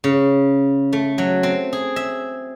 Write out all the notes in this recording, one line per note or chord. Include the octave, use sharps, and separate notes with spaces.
C#3
A3
F#3
C4
G#4
E5